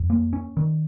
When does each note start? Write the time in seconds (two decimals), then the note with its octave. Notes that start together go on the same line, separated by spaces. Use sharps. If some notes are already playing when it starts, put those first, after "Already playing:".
Already playing: F2
0.10 A#3
0.33 C#4
0.57 D#3